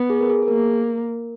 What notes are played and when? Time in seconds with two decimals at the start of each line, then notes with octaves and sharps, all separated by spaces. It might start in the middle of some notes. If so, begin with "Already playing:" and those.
Already playing: B3
0.10 G#4
0.21 A#4
0.30 G#4
0.43 G#4
0.48 A#3 A#4